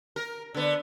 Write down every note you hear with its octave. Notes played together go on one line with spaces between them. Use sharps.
A#4
D3 B3